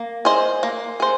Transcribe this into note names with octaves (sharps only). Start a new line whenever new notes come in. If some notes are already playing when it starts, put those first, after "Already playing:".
Already playing: A#3
G#4 C5 D#5
A#3
G#4 C5